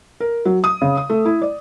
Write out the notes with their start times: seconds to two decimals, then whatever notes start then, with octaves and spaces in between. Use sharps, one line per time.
0.20 A#4
0.45 F#3
0.64 D#6
0.82 C#3
0.97 D#6
1.10 A3
1.25 E4
1.42 D5